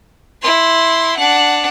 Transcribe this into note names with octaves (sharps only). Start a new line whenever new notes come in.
E4 C6
D4 F#5